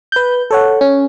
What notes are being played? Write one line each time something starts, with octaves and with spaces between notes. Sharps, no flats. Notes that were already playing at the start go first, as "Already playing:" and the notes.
B4 G6
A4 C#5 F#5
C#4